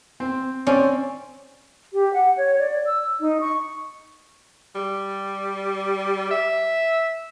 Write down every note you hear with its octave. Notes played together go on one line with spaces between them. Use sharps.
C4
C4 C#4 D5
G4
F#5
C#5
D5
E6
D#4
C#6
G3
E5